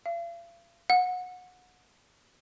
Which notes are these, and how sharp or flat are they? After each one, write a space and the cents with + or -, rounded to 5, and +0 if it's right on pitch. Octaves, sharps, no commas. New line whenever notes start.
F5 -45
F#5 -25